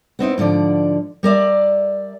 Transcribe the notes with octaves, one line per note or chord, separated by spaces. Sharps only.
B3 C4 D#4 E4
G#2 D3 F3 D5
G3 A#4 D5 E5